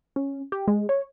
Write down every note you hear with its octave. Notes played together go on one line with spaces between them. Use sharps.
C#4
G4
G#3
C#5